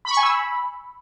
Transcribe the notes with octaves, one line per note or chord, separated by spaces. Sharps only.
B5
C#6
G#5
E6
B5